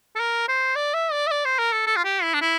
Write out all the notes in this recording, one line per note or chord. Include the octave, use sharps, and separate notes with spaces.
A4
A#4
C5
D5
E5
D5
E5
D5
C5
A#4
A4
A4
F4
G4
E4
D4
E4